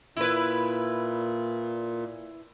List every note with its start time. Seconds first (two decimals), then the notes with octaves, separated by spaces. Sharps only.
0.17 A#2 E4 B4